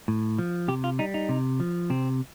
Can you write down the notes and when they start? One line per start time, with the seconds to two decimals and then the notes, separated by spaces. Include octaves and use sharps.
0.08 A2
0.39 F3
0.68 C3 G4
0.84 F4
0.99 G3 D#4
1.14 D#4
1.29 C3
1.60 F3
1.90 C3 C4